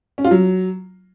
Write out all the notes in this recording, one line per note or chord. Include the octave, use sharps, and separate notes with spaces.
C#4
F4
F#3